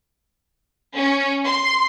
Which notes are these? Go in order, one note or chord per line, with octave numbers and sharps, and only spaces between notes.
C#4
C6